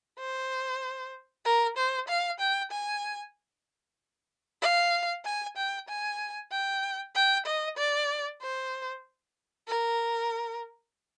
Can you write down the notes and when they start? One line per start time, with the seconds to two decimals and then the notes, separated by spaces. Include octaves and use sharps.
0.19 C5
1.45 A#4
1.77 C5
2.08 F5
2.40 G5
2.71 G#5
4.62 F5
5.25 G#5
5.57 G5
5.89 G#5
6.52 G5
7.15 G5
7.46 D#5
7.77 D5
8.41 C5
9.68 A#4